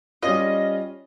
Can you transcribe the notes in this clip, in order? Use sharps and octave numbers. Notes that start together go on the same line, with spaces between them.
G3 C#4 F4 D#5